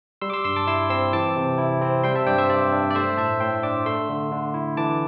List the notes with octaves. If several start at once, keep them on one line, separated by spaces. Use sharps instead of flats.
G3 C6 E6
D6
C6 E6
G2 C6 E6
A5 D6
E4 C6 E6
C4 C6 E6
E3 A5 D6
C3
E4
C4
G3 G5 C6
E5 A5
G2 D5 G5
C5 E5
G2 D5
D4
D5
A3 C5 E5
A2 E5 A5
A2 G5 C6
D4 A5 D6
A3 C6 E6
D3
D3
E4
E3 A5 D6